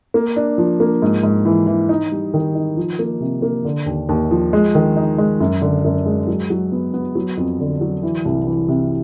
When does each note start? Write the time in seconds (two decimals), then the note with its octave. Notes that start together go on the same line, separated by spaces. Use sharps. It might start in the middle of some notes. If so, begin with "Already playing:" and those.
0.14 A#3
0.36 D4
0.58 F3
0.80 A#3
1.02 G#2
1.23 G#2
1.45 E3
1.67 E3
1.89 D#4
2.12 G3
2.34 D#3
2.55 D#4
2.77 F3
2.99 A#3
3.20 C3
3.42 A#3
3.65 D3
3.86 D#2
4.09 D#2
4.31 F3
4.53 G#3
4.75 D#3
4.96 D#4
5.18 G#3
5.40 F#2
5.61 D3
5.84 F#2
6.05 G#3
6.28 F#3
6.50 F#3
6.72 B3
6.94 B3
7.15 F#3
7.37 F2
7.60 D3
7.81 F#3
8.03 E3
8.25 C2
8.47 E3
8.68 C3